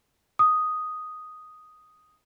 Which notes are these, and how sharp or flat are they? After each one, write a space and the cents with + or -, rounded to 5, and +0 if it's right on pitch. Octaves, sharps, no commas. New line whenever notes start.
D#6 +0